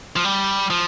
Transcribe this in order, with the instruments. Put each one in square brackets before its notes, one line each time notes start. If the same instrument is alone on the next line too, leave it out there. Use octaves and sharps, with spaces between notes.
[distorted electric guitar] F3
G3
F3